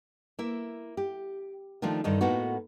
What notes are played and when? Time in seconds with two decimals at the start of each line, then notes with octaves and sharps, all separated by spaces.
0.39 A#3 E4 E5
0.97 G4
1.82 D#3 F3 A3 D4 F4
2.04 G2 D3 D#3 D#4 D#5
2.21 A2 A#3 B3 D#4 F#4